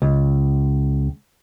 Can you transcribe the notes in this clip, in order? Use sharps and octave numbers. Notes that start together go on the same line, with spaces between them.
C#2